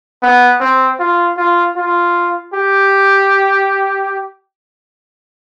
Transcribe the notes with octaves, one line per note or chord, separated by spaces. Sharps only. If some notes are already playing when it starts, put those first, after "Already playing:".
B3
C4
F4
F4
F4
G4